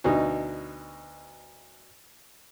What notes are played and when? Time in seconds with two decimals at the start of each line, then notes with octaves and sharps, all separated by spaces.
0.04 D2 B2 D#4